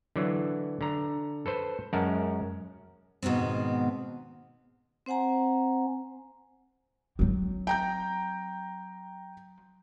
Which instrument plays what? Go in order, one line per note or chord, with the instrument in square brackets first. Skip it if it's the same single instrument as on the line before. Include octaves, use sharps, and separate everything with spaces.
[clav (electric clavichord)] D3 E3 F#3
D3 A#5
A4 B4 C5
F#2 G#3 C#4 A#4 F#5 A5
[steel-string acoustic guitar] G#2 B2 D#3 B3 C4
[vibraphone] C4 C5 F#5 G#5 A#5
[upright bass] F#3 C4
[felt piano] G5 A#5 G6